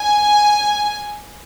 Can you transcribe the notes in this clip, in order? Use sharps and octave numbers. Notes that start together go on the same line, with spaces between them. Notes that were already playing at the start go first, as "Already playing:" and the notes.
Already playing: G#5